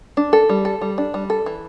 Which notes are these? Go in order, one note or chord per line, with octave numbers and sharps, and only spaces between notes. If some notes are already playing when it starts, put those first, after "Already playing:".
D4
A4
G3
A4
G3
D4
G3
A4
E3